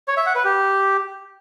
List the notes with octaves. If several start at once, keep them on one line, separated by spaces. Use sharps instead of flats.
C#5
E5
F#5
B4
G4